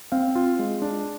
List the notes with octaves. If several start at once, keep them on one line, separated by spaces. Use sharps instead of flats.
C4 F5
F4
G#3
D4